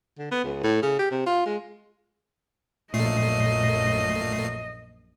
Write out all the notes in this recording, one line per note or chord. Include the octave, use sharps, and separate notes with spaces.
D3
B3
C#2
A2
C#3
G4
C3
F4
G#3
A#1 F#2 A#2 A3 D#5 C7